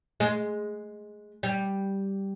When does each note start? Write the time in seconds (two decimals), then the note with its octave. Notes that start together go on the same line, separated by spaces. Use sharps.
0.20 G#3
1.43 G3